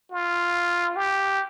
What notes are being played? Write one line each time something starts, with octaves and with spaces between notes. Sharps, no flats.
F4
G4